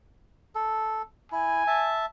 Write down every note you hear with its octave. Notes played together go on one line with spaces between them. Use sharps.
A4
E4 G#5
E5 A5